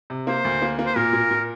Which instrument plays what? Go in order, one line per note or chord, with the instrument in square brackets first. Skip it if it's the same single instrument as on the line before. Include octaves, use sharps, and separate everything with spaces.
[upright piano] C3
[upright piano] A#3 [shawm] C5
[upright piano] D2
A#3
A#3
[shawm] C5
[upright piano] A#2 [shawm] A#4
[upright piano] A#2
A#2